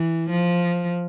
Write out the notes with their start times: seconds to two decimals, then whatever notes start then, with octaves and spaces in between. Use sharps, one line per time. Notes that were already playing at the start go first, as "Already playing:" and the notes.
Already playing: E3
0.30 F3